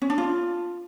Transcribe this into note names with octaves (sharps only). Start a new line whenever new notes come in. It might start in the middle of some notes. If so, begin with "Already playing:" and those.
C#4
D4
F4